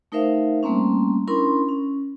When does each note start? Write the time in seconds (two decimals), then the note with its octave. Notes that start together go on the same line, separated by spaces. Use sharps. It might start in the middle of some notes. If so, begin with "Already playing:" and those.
0.12 A3 D#4 A#4 C5 E5 F5
0.63 G3 A3 A#3 C4 C#4
1.27 C#4 D4 E4 A#4 B5 C6
1.69 C#4